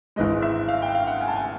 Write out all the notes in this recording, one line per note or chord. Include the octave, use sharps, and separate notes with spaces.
G#1 G#2 E3 G#3 D#5
E5
F5
G5
F5
F#5
G#5
A5
G#5